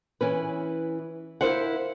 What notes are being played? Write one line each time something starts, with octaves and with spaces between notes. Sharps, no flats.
E3 C#4 B4
E4 A#4 C5 F5 F#5